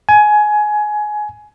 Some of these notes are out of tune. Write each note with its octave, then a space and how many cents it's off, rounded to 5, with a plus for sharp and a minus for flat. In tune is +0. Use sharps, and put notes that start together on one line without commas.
G#5 +20